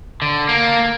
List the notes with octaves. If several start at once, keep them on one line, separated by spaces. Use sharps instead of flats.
D3
A#3